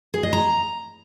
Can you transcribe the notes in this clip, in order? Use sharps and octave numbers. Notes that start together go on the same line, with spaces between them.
G#4
D#5
A#5